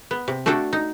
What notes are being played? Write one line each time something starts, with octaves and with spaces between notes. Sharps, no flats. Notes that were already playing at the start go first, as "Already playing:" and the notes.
B3
C3
A3 D4 F#4 A4 G5
D#4